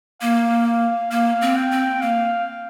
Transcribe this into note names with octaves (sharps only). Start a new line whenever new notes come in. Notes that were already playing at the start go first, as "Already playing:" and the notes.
A#3 F5
F5
A#3 F5
C4
G5
C4
A#3 F5